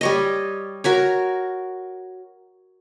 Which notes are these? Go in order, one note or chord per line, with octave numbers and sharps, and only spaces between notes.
G3 C#5 D#5
F#4 A#4 C#5